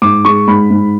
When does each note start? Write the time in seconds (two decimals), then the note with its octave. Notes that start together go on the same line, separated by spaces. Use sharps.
0.02 G#2 D6
0.25 G#3 C#6
0.48 G#2 B5
0.70 G#2